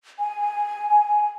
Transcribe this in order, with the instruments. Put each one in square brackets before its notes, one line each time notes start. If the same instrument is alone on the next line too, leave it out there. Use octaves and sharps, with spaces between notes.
[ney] G#5